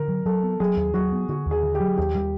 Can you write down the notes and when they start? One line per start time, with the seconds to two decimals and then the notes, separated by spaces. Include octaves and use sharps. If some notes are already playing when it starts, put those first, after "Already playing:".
Already playing: D3 A#4
0.08 F#3
0.25 F#3 A4
0.43 B3
0.60 F#3 G#4
0.77 D#2
0.94 F#3 F#4
1.12 B3
1.29 D3 F#4
1.46 D#2 G#4
1.63 D3
1.75 G4
1.80 F#3
1.97 D#2 G4
2.15 G3